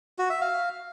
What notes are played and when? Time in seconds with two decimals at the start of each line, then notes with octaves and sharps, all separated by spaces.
0.19 F#4
0.30 E5
0.41 F5